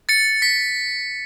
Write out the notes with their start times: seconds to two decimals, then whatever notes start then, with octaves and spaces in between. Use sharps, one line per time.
0.09 A6 C#7
0.42 B6